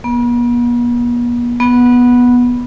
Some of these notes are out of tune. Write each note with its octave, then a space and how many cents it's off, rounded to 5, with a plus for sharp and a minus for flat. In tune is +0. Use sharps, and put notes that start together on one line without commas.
B3 -45
B3 -10